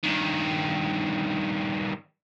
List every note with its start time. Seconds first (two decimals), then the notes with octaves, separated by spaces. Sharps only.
0.04 G2 D#3